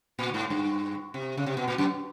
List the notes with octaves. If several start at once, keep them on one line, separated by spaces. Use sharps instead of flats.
A#2
G#2
G2
C3
C#3
C3
B2
A#2
F#2